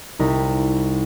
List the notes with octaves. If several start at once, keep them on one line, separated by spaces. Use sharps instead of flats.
C2 D#4 E4